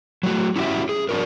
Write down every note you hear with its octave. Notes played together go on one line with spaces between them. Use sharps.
F#3 A3 F#4
C#4 E4 F#4 G4 E5
G#4
D4 F#4 A#4